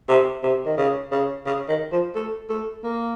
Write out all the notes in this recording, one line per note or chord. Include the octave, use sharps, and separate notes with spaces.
C3
C3
D#3
C#3
C#3
C#3
D#3
F3
A3
A3
A#3